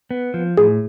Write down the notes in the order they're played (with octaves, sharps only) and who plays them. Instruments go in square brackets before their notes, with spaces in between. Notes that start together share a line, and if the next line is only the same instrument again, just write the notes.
[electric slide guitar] B3
F3
[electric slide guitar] A2 [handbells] G#4